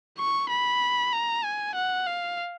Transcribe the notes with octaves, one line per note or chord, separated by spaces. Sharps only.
C#6
B5
A#5
G#5
F#5
F5